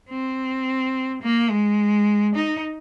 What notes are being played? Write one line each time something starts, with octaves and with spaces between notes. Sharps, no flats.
C4
A#3
G#3
D#4